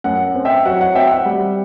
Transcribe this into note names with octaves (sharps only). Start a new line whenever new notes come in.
F#2 F#5
C4
E5 G5
F#3 F#5
F#5
C4 E5 G5
F#5
G3